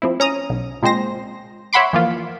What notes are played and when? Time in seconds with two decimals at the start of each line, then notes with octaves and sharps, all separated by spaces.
0.02 F3 C4 E4
0.20 C#4 A#5 D#6
0.50 B1
0.82 A#2 G#3 C4 C5 A#6
1.73 C#5 E5 F#5 B5 C6 D6
1.93 E3 F3 A#3 F4